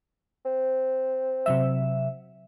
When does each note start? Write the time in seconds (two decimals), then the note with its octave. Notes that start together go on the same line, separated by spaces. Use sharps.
0.45 C4
1.46 C3 F#3 E5